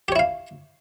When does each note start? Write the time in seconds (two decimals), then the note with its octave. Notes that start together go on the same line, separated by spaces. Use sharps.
0.08 G4
0.12 C#5
0.16 E4
0.19 F5